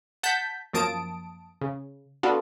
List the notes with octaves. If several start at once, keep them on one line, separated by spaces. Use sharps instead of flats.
F#5 A5 G6 B6
F#2 F3 A#3 A5 D#6 D7
C#3
B3 D4 F4 F#4 A4